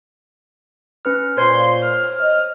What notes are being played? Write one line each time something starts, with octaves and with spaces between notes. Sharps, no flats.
C#4 B4 F6
A#2 C5 C#5 C6
F6
D#5